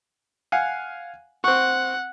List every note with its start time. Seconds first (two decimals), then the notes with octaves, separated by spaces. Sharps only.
0.52 F5 F#5 G#5
1.44 C4 F#5 C#6